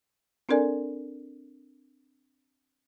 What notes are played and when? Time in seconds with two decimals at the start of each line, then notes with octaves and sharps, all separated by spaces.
0.49 C4 D4 A4 A#4 D5 G#5